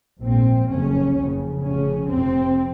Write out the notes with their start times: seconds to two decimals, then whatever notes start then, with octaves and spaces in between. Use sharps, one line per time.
0.21 A#1 G#2 C4
0.68 F#1 F2 C#3 C#4
1.15 F#1 F2 C#3
1.63 F1 F2 C#3 C#4
2.09 F1 F2 C3 C4